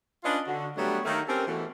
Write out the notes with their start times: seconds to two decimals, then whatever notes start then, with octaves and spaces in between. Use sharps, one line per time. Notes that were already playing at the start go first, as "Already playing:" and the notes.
0.24 C#4 D4 F4 B4 D#5
0.47 D3 F#4
0.76 F#3 G3 A3 B3 D4 C#5
1.04 D#3 A3 A#3
1.28 C4 C#4 G4 A4 A#4 C5
1.47 B2 E3 A3